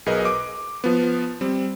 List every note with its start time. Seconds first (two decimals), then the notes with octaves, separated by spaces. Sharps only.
0.06 B1 G#4 A#4 B4 D#5
0.25 D6
0.84 F3 B3
1.41 G3 C4